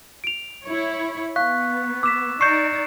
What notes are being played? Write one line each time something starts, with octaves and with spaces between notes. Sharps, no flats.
D7 F7
E4 C#5
B3 F5 C#6 F#6 B6
D6 E6 B6 E7
D#4 D5 C#6 G6 C7 C#7 E7